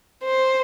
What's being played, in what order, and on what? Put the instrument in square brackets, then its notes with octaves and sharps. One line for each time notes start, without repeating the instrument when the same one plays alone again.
[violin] C5